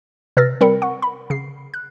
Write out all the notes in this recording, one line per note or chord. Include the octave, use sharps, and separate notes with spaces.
C3 B4 E6 F6 A6 A#6
G3 C4 A#4 B5 C#7
F#5 C#6
B5
C#3 C7
F#6